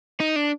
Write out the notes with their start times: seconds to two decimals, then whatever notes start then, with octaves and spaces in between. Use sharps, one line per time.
0.20 D#4
0.36 D4